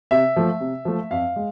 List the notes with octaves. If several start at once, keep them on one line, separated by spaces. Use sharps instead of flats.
C3 E5
F3 A3
C3
F3 A3
F2 F5
G#3